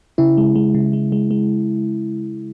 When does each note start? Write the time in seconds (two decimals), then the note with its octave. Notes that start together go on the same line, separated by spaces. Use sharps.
0.18 C#3 E4
0.37 G#3
0.55 G#3
0.74 C#3
0.93 G#3
1.12 G#3
1.31 G#3